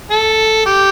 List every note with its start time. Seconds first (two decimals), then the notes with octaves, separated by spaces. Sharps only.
0.10 A4
0.66 G4